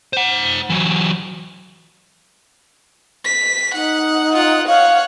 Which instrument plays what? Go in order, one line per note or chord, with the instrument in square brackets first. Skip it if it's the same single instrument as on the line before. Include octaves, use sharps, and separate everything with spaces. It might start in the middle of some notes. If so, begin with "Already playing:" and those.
[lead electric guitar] C5 F#5
E3 F#3
[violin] B6
[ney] D#4 [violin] F#5
[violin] F4 F#5
[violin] C#5 F#5 [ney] F5